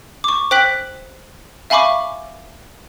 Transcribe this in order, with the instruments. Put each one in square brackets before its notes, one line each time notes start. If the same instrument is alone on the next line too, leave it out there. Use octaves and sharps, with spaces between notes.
[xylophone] C#6 D6
C5 G5 F#6 B6 F#7
E5 F5 G#5 B5 C#6 D6